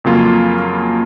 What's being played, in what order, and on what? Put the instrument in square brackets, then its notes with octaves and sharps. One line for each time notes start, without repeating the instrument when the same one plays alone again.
[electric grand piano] F2 C#3 F#3 A#3 F4